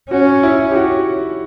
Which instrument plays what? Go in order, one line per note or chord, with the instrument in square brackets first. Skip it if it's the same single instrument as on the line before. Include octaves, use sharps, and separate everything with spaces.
[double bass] C#4 [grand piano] F#4
[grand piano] E4
G4
F#4